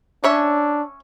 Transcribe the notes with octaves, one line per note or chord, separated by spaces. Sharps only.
C#4 D4 C#5 E5